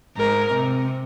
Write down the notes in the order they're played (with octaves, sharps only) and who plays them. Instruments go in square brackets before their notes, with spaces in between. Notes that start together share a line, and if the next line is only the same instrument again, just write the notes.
[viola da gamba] G#2 [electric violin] A#4
[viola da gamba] C3